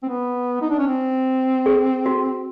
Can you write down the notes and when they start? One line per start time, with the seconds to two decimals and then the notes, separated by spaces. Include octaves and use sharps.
0.03 C4
0.09 B3
0.62 D#4
0.70 D4
0.79 C#4
0.87 C4
1.66 G#4
2.06 F#4